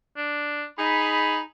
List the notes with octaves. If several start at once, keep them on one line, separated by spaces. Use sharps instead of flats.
D4
D#4 G#4 B5